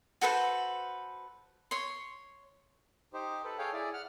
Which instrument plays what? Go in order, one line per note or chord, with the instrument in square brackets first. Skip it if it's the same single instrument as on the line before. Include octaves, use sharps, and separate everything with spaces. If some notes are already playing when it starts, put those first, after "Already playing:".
[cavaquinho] F#4 A4 B4 C5
C#5 C6
[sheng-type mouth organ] D#4 G4 C5
A4 B4
G#4 A4 C#5 F5 G5
E4 G#4 D5
F#5 F6